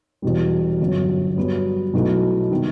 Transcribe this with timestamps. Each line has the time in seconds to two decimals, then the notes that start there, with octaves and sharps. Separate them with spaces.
0.22 E1 E2 B2 G3
0.80 G1 F#2 F#3
1.37 G2 F#3 B3 F#4
1.94 B1 B2 A3 E4
2.51 C3 D#3 G3 B3